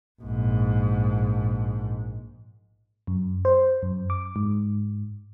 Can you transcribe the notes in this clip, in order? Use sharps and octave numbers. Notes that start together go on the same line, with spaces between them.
A#1 G#2
F#2
C5
F#2
D6
G#2